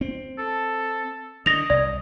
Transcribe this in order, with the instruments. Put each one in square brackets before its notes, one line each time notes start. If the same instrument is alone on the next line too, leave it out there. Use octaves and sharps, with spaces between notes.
[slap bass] C4
[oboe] A4
[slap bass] D3 [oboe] D#5 [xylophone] A#6 F7
[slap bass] C2 [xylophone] D5